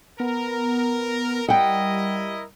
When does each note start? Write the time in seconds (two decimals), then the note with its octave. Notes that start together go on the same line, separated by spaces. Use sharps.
0.20 B3 A#4
1.48 G3 E4 A#4 D#5 F#5 G5